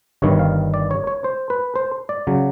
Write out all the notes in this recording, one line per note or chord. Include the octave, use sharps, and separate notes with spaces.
G1 G2 D#3 G3 C#5
F5
D5
C#5
C#5
C5
B4
C5
D5
C#3 F#3